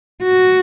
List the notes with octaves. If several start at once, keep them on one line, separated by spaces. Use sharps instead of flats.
F#4